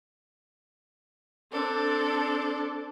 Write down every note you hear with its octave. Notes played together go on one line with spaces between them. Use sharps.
C4 D4 A4